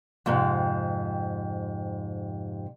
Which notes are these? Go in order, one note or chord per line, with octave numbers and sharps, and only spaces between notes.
F2 G#2 C3